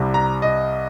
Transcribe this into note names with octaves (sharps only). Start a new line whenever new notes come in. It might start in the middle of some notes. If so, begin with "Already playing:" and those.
Already playing: C2 C3 G3
A#5
D#5